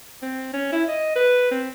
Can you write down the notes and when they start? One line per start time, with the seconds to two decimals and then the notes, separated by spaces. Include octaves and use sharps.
0.22 C4
0.53 C#4
0.72 E4
0.88 D#5
1.15 B4
1.51 C4